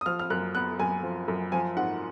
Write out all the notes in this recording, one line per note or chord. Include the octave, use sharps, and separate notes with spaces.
D#6
F3 F6
F6
F#2 F#6
B3 F#6
F#2 G#5
F3
F#2
F3 G#5
G#2 F#5